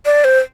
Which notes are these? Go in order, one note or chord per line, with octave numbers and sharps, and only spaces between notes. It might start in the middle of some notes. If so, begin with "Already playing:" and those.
D5
C5